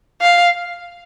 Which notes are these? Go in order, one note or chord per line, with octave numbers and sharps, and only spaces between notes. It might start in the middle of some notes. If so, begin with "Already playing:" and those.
F5